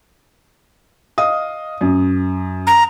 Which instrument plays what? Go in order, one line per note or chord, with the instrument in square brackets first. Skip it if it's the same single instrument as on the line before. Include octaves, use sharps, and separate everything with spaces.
[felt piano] D#5 F5 D#6
F#2
[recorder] A#5